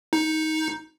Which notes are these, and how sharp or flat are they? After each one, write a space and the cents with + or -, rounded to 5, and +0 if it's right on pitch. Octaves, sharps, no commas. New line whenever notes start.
D#4 +15